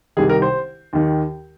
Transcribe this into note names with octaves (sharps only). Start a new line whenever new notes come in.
C2 C3 D#3 G#4
A#4
C5
D#2 D#3